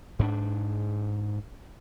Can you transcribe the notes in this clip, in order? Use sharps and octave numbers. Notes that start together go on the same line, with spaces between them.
G#2 C4 D4